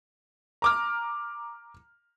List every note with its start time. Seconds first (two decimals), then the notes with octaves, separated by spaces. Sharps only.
0.62 A#5 D6 F6